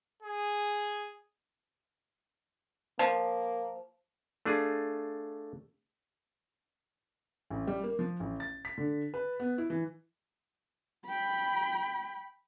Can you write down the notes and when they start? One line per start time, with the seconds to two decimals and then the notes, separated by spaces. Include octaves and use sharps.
0.23 G#4
2.99 F3 A#3
4.46 A3 D4 F4 G#4
7.50 A1
7.67 G3
7.84 A#3
7.99 F3
8.20 A1
8.40 A6
8.65 B6
8.78 D3
9.14 B4
9.40 B3
9.58 E4
9.70 E3
11.06 G5 B5